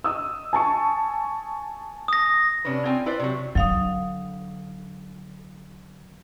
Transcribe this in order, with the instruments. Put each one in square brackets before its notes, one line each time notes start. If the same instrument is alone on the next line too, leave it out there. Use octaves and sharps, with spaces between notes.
[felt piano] D#5 D#6 E6
G#5 A5 C#6
[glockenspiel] D#6 A#6
[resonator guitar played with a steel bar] C3 C#4 D4 B4
C4 F4 G5 G#5
E4 B4 C5 D5
C3 F#3
[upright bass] D3 [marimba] F#3 F5 D#6